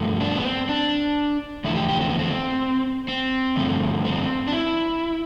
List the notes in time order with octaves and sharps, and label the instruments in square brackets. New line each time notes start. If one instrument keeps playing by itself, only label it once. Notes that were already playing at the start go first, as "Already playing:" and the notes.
Already playing: [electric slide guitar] G2 F3 A3
D4
B3
C4
D4
E2 D3 F3 A3 E4
G4
G4
C4
B3
C4
C4
G2 D3 F3 A3
C4
D4
E4